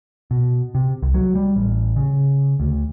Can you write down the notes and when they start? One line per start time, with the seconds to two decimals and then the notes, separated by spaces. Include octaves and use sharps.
0.31 B2
0.75 C3
1.02 C2
1.14 F#3
1.35 G3
1.56 A1
1.96 C#3
2.60 D2